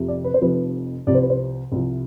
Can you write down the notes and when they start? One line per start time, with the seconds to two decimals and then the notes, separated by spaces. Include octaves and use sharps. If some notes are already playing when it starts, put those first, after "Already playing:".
Already playing: F1 F2 C3 F3
0.08 D5
0.24 B4
0.34 C5
0.41 F1 F2 C3 F3 B4
1.07 C2 C3 F3 D5
1.15 C5
1.22 B4
1.30 C5
1.72 C2 C3 F3